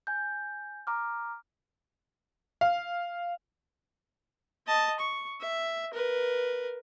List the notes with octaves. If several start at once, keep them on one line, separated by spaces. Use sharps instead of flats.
G#5 G6
A#5 D6 F6
F5
D#5 A5
C#6
E5
A#4 B4